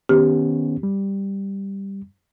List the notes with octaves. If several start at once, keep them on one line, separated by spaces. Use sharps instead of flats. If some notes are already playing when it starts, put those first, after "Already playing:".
D#3 B3 C#4 G4
G3